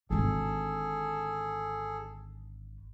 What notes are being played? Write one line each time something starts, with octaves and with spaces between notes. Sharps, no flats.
G#1 D3 G#4 A4